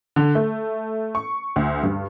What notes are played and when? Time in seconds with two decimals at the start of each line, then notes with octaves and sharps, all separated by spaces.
0.16 D3
0.35 A3
1.15 C#6
1.56 D2
1.83 G2